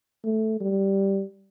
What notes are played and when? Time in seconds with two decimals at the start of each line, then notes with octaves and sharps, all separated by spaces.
0.24 A3
0.60 G3